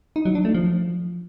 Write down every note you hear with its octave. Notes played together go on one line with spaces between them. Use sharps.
D#4
F#3
D4
A3
F3